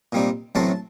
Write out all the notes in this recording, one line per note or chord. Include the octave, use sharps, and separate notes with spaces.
A#2 G3 C4 D#4
A1 A2 F#3 A3 C4 A5